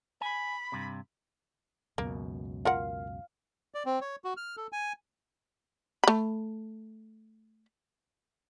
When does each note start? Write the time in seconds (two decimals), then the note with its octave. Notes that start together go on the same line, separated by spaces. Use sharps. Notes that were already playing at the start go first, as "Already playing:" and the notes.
0.21 G#5 B5
0.72 G2 C3
1.98 C#2 F#2 B2 A#3
2.65 F4 A#4 F5 F#5
3.74 D5
3.86 C4
4.01 C#5
4.24 F#4
4.37 F6
4.57 A4
4.72 G#5
6.04 A3 B5